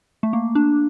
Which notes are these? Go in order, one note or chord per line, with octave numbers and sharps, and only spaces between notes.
A3
A#3
D4